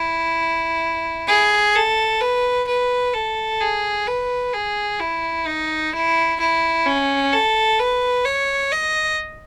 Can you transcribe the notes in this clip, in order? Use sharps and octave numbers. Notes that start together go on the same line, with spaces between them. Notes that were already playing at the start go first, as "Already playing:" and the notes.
Already playing: E4
G#4
A4
B4
B4
A4
G#4
B4
G#4
E4
D#4
E4
E4
C#4
A4
B4
C#5
D#5